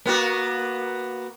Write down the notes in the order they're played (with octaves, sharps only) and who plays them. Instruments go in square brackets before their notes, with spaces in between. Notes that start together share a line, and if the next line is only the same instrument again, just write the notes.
[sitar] A#3 B3 F#4